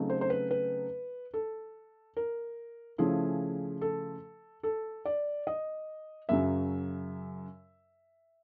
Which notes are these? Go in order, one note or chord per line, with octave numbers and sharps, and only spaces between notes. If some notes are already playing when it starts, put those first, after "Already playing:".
Already playing: C#3 F#3 A3 C4 D#4
C5
C5
B4
B4
A4
A#4
C#3 F3 A3 C#4 E4 G#4
A4
A4
D5
D#5
F#2 C#3 F#3 E5